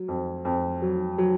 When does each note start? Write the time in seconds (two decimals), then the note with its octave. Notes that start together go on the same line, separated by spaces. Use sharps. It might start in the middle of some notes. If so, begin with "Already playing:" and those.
Already playing: F#3
0.08 F2
0.45 F2
0.82 F#3
1.18 F#3